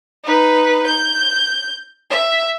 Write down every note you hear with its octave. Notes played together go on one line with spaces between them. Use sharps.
D#4 B4
G6
E5